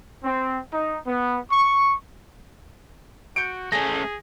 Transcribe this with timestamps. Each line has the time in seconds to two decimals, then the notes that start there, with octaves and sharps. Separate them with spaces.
0.24 C4
0.72 D#4
1.07 B3
1.51 C#6
3.36 F#4 G6 C#7 D7
3.72 A3 C#4 G#4 A#6